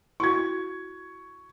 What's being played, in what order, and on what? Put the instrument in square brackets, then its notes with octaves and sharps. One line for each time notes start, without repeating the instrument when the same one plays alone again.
[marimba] E4 F#4 [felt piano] C#6 G#6